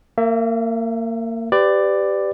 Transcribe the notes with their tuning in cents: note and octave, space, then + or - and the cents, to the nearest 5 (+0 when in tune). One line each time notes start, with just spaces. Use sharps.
A#3 -25 E5 +25
G4 -5 B4 +35 D5 +10